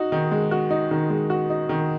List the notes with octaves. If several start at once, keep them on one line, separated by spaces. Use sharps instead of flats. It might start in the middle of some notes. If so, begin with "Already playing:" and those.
Already playing: D#4 F#4
D#3
G#3
F#4
D#4
D#3
G#3
F#4
D#4
D#3